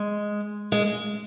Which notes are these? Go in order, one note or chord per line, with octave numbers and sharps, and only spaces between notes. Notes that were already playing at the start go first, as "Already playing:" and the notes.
Already playing: G#3
G#3